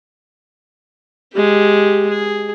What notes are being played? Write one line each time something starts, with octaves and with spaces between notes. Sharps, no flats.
G#3 G4
G#4